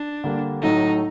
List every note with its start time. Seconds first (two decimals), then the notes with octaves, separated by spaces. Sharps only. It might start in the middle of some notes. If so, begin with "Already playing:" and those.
Already playing: D4
0.24 D3 G3 A#3
0.62 A2 F#3 A3 D#4